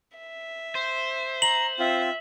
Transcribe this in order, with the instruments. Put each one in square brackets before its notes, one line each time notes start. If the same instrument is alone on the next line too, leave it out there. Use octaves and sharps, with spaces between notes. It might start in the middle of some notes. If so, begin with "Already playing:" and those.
[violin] E5
[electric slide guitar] C5
[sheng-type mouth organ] A#5 [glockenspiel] F#7
[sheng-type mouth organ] C4 F4 [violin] E5